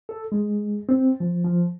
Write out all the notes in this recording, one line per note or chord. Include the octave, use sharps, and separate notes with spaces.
A4
G#3
C4
F3
F3